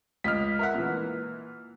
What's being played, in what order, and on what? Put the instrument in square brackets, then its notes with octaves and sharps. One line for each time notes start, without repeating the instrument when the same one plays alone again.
[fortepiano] C#2 D#5 [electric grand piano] F6 B6
[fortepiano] A#4 E5 F#5
A#2 E3